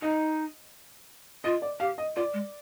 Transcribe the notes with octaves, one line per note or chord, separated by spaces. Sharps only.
D#4 D#5
F4 D#5
D5
G4 F5
D#5
F4 D5
G#3